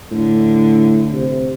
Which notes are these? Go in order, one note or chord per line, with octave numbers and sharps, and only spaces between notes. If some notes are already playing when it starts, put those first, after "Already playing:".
A2 D3
C3